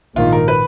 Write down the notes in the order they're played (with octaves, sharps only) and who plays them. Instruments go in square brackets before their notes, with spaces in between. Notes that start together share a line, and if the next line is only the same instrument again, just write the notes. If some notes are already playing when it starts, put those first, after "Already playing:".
[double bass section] A#1 G#2 D#3 A#3 [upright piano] F4
[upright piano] A#4
B4